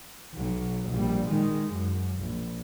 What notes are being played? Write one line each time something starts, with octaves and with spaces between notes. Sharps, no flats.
B1 F#3
A#1 G3
D#3 G#3
F#2
A#1